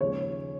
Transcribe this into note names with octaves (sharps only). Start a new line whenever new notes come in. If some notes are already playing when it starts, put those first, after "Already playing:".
D#2 C#3 F3 G#3 C#4 C#5